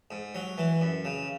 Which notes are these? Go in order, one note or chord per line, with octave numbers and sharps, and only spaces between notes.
G#2
F#3
E3
F#2
C#3